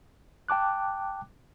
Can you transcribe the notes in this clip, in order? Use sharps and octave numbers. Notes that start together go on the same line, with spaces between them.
G5 A5 D6 F#6